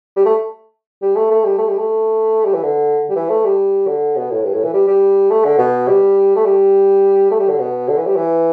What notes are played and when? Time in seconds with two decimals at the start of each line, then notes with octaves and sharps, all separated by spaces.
0.16 G3
0.25 A3
1.02 G3
1.16 A3
1.31 A3
1.44 G3
1.58 A3
1.68 G3
1.78 A3
2.45 G3
2.54 E3
2.64 D3
3.10 G3
3.16 E3
3.30 A3
3.45 G3
3.88 D3
4.16 B2
4.31 A2
4.44 G2
4.54 A2
4.64 E3
4.74 G3
4.88 G3
5.30 A3
5.45 D3
5.59 B2
5.88 G3
6.36 A3
6.45 G3
7.31 A3
7.40 G3
7.49 D3
7.59 B2
7.88 D3
7.98 E3
8.07 G3
8.16 E3